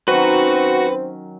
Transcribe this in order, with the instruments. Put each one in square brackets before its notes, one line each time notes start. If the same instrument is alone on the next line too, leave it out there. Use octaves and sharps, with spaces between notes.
[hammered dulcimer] D#3 F#3 C#4 [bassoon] C4 [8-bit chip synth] F#4 [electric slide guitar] B4